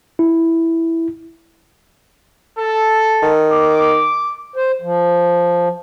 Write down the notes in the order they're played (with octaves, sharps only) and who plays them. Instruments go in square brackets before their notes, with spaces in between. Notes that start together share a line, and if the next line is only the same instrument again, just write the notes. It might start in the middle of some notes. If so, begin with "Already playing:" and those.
[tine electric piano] E4
[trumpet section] A4
[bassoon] D#3
[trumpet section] D6
[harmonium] C5
F3